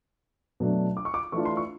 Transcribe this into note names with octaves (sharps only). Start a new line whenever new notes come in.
B2 F#3 A3 D4
D6
C#6
D6
E3 A3 D4 F4 C#6
C6
C#6